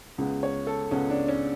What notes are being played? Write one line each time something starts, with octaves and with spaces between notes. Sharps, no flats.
C#2 C#3 G#3 B3
C#5
A4
C#2 C#3 G#3 B3 C#4
D4
C#4